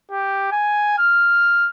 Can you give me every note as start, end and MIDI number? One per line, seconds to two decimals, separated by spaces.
0.11 0.50 67
0.52 0.95 80
0.99 1.69 89